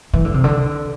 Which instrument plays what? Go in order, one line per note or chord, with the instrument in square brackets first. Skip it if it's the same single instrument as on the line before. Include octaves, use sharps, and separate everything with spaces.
[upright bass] E3
D3
C3
D3